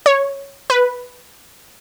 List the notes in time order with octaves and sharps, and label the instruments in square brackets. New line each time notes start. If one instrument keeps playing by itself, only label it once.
[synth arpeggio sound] C#5
B4